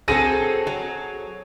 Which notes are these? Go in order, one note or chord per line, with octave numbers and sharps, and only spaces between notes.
F#3 C4 G#4 A4 A#6 D#7
F#3